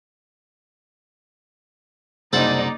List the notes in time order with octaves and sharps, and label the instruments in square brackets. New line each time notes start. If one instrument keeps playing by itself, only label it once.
[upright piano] F#1 [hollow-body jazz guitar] C2 [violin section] D#4 D5 [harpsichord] A4 C5 F#5